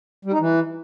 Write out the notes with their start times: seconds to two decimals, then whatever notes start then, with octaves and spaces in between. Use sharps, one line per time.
0.25 G3
0.32 D#4
0.40 E3